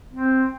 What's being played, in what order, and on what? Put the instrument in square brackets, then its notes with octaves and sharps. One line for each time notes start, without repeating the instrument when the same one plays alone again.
[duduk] C4